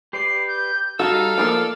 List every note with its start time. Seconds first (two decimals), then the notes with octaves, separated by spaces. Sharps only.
0.13 G4 B4 D5 C7
0.48 G6
0.99 G3 D#4 F#4 A4 F5 E6
1.38 F3 G3 A#3 D5